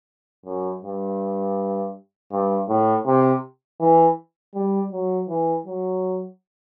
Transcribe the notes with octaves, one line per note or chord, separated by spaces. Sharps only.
F#2
G2
G2
A2
C3
E3
G3
F#3
E3
F#3